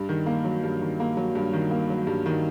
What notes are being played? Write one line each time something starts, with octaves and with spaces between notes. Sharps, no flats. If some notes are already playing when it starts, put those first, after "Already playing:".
Already playing: G2
D#3
A#3
F#3
G2
D#3
A#3
F#3
G2
D#3
A#3
F#3
G2
D#3